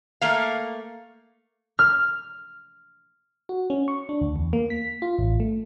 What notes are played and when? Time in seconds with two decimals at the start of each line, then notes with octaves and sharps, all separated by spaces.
0.21 A3 A#3 F5
1.79 F6
3.49 F#4
3.70 C#4
3.88 C#6
4.09 D4
4.21 D2
4.36 E2
4.53 A#3
4.70 B6
5.02 F4
5.18 A1
5.40 A3